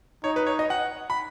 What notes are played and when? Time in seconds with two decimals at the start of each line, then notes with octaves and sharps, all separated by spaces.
0.24 D#4 C#5
0.36 B4
0.47 C#5
0.59 D#5
0.70 F#5
1.10 B5